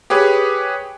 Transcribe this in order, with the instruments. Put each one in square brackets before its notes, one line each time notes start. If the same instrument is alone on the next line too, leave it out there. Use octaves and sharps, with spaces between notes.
[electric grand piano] G4 G#4 B4 C#5